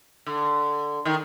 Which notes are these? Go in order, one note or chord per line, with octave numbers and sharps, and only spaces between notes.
D3
D#3